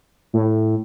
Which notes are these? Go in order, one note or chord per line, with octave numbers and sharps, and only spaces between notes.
A2